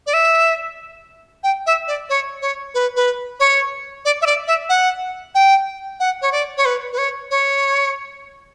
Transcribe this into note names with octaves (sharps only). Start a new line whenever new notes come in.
D5
E5
G5
E5
D5
C#5
C#5
B4
B4
C#5
D5
E5
D5
E5
F#5
G5
F#5
C#5
D5
C#5
B4
B4
C#5
C#5